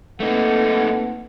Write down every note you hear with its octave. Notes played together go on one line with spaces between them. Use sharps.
A3 A#3 C4 D#4 A4 B4 F#5